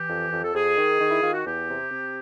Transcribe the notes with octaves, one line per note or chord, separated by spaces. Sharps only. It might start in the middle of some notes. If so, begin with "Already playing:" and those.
Already playing: E3 G4
F2
F2
A4
F2 G#4
D#3
D#3
E4
D#3 F4
F#4
E2 G4
C3
C3